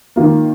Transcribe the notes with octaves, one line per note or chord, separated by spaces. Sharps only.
D#3 A#3 F4